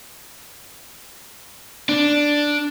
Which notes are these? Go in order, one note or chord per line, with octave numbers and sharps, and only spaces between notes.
D4